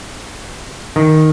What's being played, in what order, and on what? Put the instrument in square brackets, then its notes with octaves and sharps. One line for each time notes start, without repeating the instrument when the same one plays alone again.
[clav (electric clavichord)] D#3